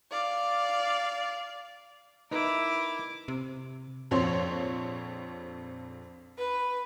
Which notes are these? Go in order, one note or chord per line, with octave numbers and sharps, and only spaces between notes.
D5 F5
D#4 E4 A#4 B4 D6
C3
A#1 F2 C4 C#5 C6
B4